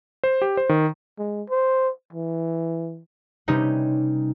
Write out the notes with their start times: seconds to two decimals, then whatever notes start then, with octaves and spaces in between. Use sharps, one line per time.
0.24 C5
0.42 G4
0.57 C5
0.69 D#3
1.19 G#3
1.50 C5
2.13 E3
3.48 C3 G3 C#4 D#4 B4